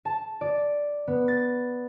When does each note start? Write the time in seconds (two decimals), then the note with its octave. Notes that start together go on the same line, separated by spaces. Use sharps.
0.05 A5
0.41 D5
1.08 B3
1.28 A6